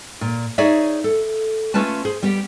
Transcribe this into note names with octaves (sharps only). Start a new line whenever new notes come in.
A#2
D#4 G#4 C#5 D5 E5
A4
A3 C#4 F4 B4 A5
G#4 C5
G3 B3 G4